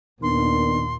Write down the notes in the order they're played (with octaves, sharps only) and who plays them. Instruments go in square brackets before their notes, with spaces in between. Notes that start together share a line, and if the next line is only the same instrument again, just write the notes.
[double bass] D#2 A#2 [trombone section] D#3 B3 D4 [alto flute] C6